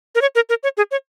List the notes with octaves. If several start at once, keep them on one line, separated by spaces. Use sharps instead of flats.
A#4
C#5
A#4
A#4
C#5
G#4
C#5